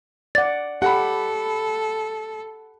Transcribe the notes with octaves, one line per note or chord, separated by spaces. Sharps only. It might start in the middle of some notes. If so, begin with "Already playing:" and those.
D5 F#5 A6
G4 A4 F#5 B5